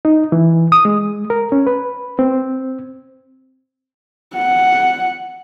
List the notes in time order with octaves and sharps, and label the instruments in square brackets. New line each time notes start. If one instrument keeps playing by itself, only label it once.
[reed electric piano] D#4
E3
D#6
G#3
A#4
C#4
B4
C4
[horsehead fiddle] F#5